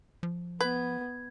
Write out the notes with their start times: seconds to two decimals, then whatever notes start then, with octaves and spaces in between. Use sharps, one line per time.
0.23 F3
0.61 B3 B4 G#6